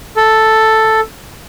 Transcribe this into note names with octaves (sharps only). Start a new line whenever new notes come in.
A4